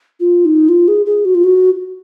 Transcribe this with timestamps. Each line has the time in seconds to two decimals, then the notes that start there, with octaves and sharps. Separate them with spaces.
0.20 F4
0.45 D#4
0.69 F4
0.88 G#4
1.06 G#4
1.25 F#4
1.35 F4
1.44 F#4